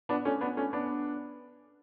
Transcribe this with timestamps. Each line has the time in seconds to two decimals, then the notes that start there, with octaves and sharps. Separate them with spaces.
0.09 B3 D4
0.25 A3 C#4
0.41 B3 D4
0.57 A3 C#4
0.73 B3 D4